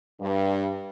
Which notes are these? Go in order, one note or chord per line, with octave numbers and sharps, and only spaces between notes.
G2